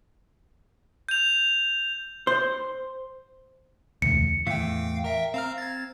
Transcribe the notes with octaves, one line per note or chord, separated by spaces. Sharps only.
G6 F7
C5
E1 D2 C#7
E2 A2 E3 F5 G5
A#4 E5 G5
C4 F5 A#5 F6
G#6 A6